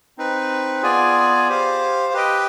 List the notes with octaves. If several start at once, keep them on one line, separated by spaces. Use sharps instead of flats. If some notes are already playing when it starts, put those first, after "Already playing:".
C4 D#4 B4
B3 F4 G#4 D5 G#5
G4 C5 F5
G4 B4 D#5 G5